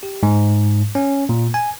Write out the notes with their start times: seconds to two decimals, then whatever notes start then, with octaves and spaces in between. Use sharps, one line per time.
0.03 G4
0.23 G#2
0.95 C#4
1.29 A#2
1.54 G#5